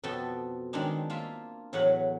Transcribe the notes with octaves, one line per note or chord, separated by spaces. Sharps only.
F2 B2 A4 G5 A5
D#3 G#3 C4 D4 D#4
A#3 F4 E5
E2 A2 F#3 B4 C#5 F#5